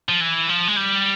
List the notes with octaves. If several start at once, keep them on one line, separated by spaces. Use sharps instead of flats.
F3
E3
F3
G#3
G3